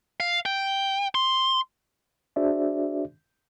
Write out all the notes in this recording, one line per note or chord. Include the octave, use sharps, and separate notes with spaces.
F5
G5
C6
D4 F#4 G#4 C5 D5 E5